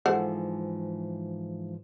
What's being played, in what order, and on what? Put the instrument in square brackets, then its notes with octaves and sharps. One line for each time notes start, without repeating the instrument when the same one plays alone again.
[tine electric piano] G#2 E3 F3 [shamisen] A4 C5 F#5